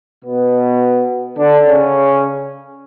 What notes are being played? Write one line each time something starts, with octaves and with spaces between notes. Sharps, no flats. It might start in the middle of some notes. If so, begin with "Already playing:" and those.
B2 B3
D3 D4
C#3 C#4